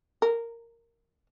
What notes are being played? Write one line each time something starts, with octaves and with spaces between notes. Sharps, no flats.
A#4